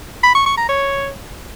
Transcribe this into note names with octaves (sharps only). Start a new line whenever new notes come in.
B5
C#6
C#6
A#5
C#5